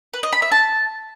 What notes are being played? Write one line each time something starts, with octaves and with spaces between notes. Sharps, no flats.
B4
D#5
B5
E5
A5